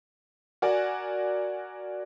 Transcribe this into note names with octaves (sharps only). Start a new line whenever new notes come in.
F#4 A#4 D5 F#5 G#5